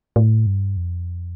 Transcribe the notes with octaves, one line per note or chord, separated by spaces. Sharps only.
A2
G2
F2